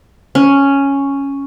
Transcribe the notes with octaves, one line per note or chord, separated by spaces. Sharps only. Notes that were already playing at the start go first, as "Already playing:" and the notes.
C#4